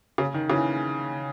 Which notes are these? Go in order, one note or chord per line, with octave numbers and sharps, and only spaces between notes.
C#3
D#3
C#3 E3